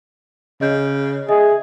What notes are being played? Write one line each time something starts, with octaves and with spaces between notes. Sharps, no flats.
C#3 D#5 G6
G#4 D#5 E5